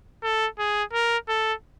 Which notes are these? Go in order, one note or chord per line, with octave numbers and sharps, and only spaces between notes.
A4
G#4
A#4
A4